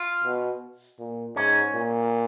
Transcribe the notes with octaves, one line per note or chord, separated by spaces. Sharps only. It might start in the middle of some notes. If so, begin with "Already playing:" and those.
Already playing: F4
B2
A#2
G#2 C#4
A#2